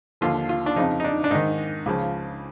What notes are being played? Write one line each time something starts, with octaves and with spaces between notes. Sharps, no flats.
D#2 D3 F3 F4
F4
D4
F2 C#3 F3 D#4
D#4
D4
D4
G#2 D#3 D#4
C#2 C#3 F3